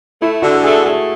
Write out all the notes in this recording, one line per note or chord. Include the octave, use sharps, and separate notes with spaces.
A3 E4
D3 F#4
A4
A3 G#4
A3 G#4